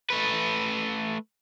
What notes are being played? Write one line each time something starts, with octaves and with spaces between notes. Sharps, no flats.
A3 B4